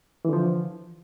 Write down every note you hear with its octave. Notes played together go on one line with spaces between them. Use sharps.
D3 E3 F3